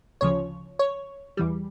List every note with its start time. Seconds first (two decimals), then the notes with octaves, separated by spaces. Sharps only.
0.21 D2 C#3 F3 C#5
0.79 C#5
1.37 E2 E3 G3